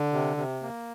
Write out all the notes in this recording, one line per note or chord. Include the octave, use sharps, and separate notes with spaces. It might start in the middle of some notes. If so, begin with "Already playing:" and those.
Already playing: D3
C3
C3
A#3